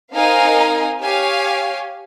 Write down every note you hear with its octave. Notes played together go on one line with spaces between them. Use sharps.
C4 D#4 A#4 F5 G#5
G4 C#5 F5 G#5